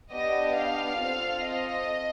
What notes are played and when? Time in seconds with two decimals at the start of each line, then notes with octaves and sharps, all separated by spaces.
0.11 B3 D4 G4 D#5
0.55 F5
0.99 C4 F4 A4
1.41 D#5